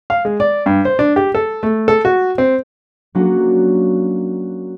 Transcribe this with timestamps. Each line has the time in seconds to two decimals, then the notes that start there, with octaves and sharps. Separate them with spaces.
0.10 F5
0.25 G#3
0.40 D5
0.66 G2
0.85 C5
0.99 D4
1.16 G4
1.35 A4
1.63 A3
1.88 A4
2.05 F#4
2.38 C4
3.15 F#3 A#3 C#4 D4 F#4